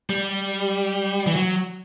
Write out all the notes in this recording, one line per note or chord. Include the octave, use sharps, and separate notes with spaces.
G3
E3
F#3